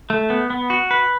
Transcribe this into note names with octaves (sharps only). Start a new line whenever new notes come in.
A3
B3
B3
F#4
B4